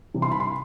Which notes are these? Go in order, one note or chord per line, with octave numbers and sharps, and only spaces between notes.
C3 E3 G3
C6
B5
C6